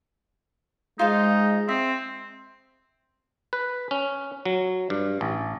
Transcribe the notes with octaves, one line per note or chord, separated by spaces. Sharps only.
G#3 D#4 F4 C5 F5
C4 E5
B4
C#4
F#3
G2
A1